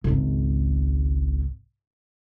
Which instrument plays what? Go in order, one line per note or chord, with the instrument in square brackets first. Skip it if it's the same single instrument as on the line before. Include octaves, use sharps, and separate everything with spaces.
[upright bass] G#1 C#2